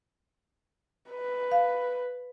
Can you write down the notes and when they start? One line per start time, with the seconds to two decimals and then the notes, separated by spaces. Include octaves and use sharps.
1.11 B4
1.52 F5